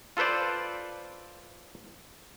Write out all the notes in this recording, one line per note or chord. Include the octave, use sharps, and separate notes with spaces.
F4 A4 B4 C5 D5